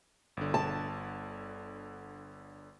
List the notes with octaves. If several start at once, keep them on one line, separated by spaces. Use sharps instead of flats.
G1 D3
A5